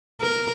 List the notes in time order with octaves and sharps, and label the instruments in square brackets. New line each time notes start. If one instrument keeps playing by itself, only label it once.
[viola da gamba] A#4